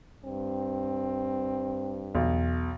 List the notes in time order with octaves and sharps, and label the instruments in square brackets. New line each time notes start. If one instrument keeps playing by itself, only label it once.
[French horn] G2 [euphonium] C4
[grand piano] B1 [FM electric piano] E2